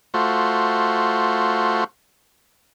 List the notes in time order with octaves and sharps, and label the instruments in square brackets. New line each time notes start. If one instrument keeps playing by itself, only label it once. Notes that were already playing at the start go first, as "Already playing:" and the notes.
[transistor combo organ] A3 F4 F#4 C5